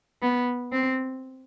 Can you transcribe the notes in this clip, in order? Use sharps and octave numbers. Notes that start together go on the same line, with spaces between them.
B3
C4